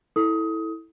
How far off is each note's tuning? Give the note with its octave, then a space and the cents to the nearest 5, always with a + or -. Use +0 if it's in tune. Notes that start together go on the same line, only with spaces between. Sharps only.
E4 -15 A4 +0 D#6 +20